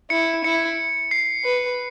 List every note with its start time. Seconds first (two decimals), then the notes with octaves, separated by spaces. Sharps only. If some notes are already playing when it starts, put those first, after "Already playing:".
0.10 E4 C#7
0.44 E4 C#7
1.11 C7
1.45 B4